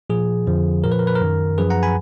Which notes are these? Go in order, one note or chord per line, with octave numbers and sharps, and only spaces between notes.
A#2 F3 G#4
F2 D3 F3
A#2 F3 A#4
B4
A#4
B4
A#4
F#2 D#3
F#2 F3 G#4 B4
F#5 A#5
G#5 B5